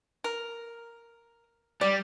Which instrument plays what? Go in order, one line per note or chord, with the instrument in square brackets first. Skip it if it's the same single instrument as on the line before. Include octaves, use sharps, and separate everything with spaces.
[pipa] A#4
[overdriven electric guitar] G3 [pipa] D5